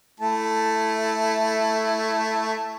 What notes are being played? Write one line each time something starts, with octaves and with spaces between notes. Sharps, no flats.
A3 E4 A5